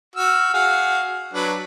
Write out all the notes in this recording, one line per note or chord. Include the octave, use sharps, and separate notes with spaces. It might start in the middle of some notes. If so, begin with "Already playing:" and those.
F#4 E6 F6
F#4 G#4 F5
F#3 D4 B4